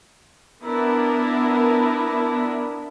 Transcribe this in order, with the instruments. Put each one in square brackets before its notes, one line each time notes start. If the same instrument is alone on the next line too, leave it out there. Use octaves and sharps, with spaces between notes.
[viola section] B3 D4 E4 A#4